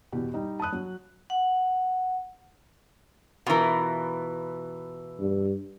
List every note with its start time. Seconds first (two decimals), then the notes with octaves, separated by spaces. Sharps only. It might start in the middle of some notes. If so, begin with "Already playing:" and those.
0.12 E2 B2 G4
0.34 G3 D#4
0.60 A5 B5 D#6 F#6
0.72 F#3
1.30 F#5
3.46 B2 E3 F4 A#4
5.19 G2